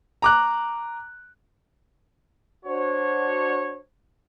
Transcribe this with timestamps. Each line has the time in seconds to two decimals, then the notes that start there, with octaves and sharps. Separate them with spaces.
0.22 A#5 D6 F#6
2.65 D4 F#4 C5 C#5